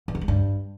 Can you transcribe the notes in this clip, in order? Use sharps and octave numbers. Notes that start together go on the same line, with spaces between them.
E3
B3
G#3
G2